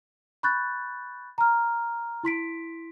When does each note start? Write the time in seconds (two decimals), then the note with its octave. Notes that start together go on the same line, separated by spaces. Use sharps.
0.43 B5 C#6 F#6 G6 A6
1.38 A#5 F6
2.23 E4 C6 B6 D7